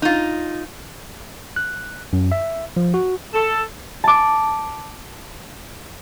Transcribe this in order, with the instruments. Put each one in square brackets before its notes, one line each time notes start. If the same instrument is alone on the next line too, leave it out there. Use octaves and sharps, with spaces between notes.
[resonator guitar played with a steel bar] D#4 F4
[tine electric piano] F#6
F#2
E5
F3
F#4
[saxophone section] A4
[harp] A5 D6